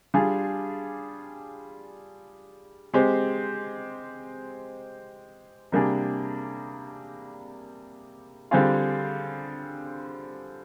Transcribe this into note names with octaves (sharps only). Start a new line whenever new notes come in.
G3 D4 F4 G#4
G#3 C4 G4
C3 G3 A#3 D4 G#4
D3 G3 C4 F4 G#4